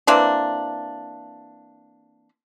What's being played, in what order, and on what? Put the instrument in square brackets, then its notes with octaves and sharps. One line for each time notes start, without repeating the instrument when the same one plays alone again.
[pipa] E3 A#3 C4 D4